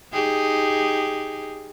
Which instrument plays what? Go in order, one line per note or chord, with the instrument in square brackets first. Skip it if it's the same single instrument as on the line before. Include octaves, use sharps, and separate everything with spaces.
[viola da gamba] D#4 G4 G#4